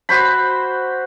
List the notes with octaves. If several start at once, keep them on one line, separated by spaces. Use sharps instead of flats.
F#4 C5 B5